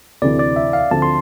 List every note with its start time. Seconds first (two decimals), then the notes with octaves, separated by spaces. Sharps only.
0.22 D2 C3 E3 D5
0.39 D5
0.56 E5
0.73 F5
0.91 D2 D3 F3 C4 A5
1.02 C6